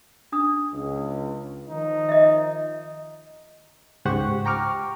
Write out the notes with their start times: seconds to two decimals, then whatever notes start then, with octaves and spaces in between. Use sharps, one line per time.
0.32 D4 D#6
0.73 C#2
1.70 D#3 F3 D#4
2.09 D#5 E5
4.05 C#2 G#2 G4 C5 F#5 C#6
4.45 G5 A#5 C#6 D6 F6